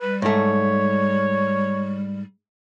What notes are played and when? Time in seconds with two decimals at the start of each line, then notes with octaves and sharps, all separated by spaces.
0.01 G3 B4
0.22 G#2 A3 C#5